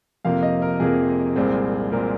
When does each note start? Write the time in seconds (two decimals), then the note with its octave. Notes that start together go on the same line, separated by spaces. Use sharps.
0.25 F2 C3 F3 A#3 F5
0.43 D#5
0.62 A#4
0.80 F2 C3 F3 A#3 G#4
1.36 C2 A#2 G#3 C4
1.92 A#2 G#3 C4 A#4